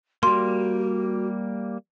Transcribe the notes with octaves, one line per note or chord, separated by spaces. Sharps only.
G3 A#3 F#4 C6